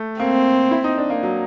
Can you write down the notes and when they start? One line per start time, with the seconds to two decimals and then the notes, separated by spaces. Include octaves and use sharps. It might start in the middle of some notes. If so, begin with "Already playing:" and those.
Already playing: A3
0.20 A#3 C4
0.71 E4
0.84 D#4
0.98 D4
1.10 A#3
1.23 F#3